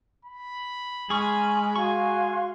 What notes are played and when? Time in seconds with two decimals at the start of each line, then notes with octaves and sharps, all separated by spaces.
0.25 B5
1.10 G#3 G#4 G#5 C6 C#6 F6
1.76 F#4 F5 G#5 C6 C#6